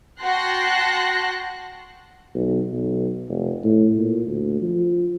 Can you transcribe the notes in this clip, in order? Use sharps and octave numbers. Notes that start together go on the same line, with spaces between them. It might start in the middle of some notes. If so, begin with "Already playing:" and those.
F#4 G5 A5 C6 F#6 A#6
B1
B1
F1
A2
A#2
D2
F3